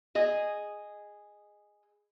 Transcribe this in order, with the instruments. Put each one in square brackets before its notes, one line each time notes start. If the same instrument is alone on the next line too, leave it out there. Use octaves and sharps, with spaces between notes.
[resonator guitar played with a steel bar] G#4 D#5